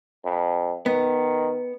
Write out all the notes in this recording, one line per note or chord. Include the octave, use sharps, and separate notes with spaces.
F2
D#3 B3